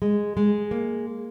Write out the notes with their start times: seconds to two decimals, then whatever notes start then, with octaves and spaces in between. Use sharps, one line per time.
0.02 G#3
0.37 G#3
0.71 A#3